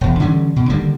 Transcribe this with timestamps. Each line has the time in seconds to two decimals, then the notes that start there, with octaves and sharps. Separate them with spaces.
0.01 E1 E2
0.20 D3 E3 G3 C#4
0.56 B2
0.70 D3 D#3 G3 A#3